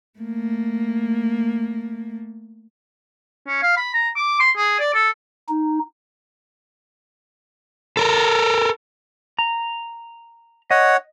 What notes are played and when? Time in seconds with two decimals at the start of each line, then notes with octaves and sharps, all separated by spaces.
0.19 A3 A#3
3.47 C#4
3.63 F5
3.77 B5
3.94 A#5
4.16 D6
4.40 C6
4.57 G#4
4.80 D5
4.94 A4
5.48 D#4
7.97 A4 A#4
9.39 A#5
10.71 C#5 D#5 F#5